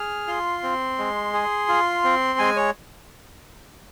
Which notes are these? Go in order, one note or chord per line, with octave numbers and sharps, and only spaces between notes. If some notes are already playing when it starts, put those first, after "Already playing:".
Already playing: G#4 F6
F4 C6
C4
G#3
G#4
F4
C4
G#3 G#5
C#5